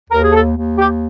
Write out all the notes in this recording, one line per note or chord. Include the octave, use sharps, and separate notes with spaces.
D#2 A#4
G#4
A4
D#2
G4